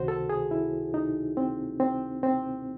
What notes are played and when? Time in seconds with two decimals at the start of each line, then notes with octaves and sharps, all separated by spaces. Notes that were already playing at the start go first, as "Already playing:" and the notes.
Already playing: C#2 C3 D#3 F#4 C5
0.08 A4
0.30 G#4
0.51 E4
0.94 D#4
1.37 C4
1.80 C4
2.23 C4